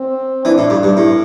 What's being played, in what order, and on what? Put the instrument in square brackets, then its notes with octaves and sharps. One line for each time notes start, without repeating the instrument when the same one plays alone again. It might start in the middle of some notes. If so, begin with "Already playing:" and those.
Already playing: [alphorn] C4
[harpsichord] E3 [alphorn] D4
[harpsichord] A2
G2
G2
A2